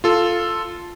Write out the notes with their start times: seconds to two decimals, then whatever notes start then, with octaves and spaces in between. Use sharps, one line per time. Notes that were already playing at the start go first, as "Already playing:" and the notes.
0.04 F4 A4